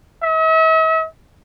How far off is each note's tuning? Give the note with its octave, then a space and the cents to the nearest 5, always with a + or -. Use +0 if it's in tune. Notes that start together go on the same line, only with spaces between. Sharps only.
E5 -45